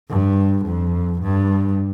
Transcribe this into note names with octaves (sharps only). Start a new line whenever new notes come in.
G2
F2
G2